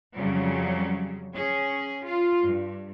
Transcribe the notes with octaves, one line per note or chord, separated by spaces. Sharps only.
F2 C#3 F#3 G3
C#4 G#4
F4
G2